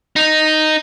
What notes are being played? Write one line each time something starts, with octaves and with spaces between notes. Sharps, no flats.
D#4